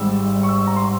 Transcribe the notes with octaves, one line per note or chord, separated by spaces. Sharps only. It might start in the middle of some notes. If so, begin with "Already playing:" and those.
Already playing: G#1 G#2 G3 E6
C#6
E6
A#5
C6